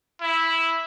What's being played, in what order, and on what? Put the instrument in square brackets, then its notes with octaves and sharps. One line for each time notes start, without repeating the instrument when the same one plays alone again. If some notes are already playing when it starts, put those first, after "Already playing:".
[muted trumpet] E4